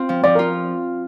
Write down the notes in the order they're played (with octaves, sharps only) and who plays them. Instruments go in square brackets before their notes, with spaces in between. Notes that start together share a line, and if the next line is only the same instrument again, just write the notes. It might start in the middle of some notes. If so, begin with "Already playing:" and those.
Already playing: [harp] C4 F4
F3
[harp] F3 [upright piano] D5
[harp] F4 [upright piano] A#4